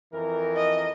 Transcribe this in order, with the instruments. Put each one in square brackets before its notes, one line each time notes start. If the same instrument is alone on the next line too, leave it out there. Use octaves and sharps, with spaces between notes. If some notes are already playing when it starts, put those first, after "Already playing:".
[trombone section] F2 E3 A#4
[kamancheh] D#5